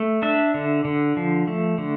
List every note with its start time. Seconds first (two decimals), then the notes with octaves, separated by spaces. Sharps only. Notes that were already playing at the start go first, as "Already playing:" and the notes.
Already playing: A3
0.22 D4 E5
0.54 D3
0.85 D3
1.17 F3
1.47 A3
1.78 D3